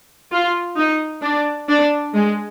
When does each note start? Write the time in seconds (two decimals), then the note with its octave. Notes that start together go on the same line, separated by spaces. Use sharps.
0.32 F4
0.77 D#4
1.22 D4
1.68 D4
2.14 G#3